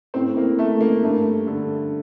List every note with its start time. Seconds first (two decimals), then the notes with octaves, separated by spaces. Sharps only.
0.14 A2 C4
0.37 A#3
0.59 A3
0.81 A#3
1.03 G2 A3
1.47 D3